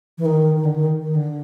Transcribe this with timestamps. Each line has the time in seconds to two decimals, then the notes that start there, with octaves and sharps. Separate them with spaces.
0.18 E3
0.25 D#3
0.55 D#3
0.65 D3
0.76 D#3
1.00 D#3
1.15 D3